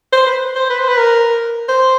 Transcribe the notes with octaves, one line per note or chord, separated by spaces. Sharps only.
C5
B4
C5
B4
C5
B4
A#4
C5